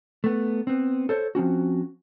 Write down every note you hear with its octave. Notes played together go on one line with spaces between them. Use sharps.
A3 B3
B3 C4
A4 C5 C#5
F3 C4 C#4 F#4